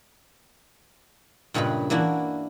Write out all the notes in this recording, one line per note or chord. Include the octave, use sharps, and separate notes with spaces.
G2 A#2 C#3 G#3 B4 B5
E3 A#3 D4 E4 F#4